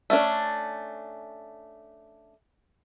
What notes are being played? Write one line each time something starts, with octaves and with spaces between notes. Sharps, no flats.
A3 C#4 D4